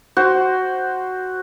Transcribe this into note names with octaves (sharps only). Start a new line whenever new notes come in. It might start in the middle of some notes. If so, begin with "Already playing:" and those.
F#4 C5